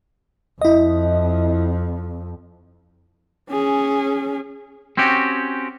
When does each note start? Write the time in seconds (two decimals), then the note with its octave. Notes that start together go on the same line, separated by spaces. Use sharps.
0.61 F2 E4 D#5
3.50 C#4 G#4
4.97 C4 C#4 F#4 G4